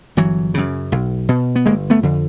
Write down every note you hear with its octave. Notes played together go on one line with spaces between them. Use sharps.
G1 E3 F#3
F#2 C#3
B1
B2
B3
G1 G#3 A#3
A3 B3
F2 D3